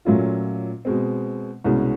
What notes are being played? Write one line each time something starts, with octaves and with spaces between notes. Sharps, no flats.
A#2 F#3 A3 C#4 F4
B2 G#3 C4
C2 B2 G#3 C#4